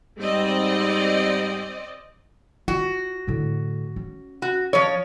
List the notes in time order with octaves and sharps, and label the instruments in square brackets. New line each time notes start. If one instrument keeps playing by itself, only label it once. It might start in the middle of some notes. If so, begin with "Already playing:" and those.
[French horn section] G#2 G3 [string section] C4 D5 D#5
[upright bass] F4 [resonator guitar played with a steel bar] F#4
[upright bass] A2 D3
C#4
[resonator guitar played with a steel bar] F#4
F3 C#5